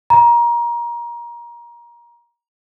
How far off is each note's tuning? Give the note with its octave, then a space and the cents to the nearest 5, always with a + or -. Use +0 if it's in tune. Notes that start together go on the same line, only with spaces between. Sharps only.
A#5 +25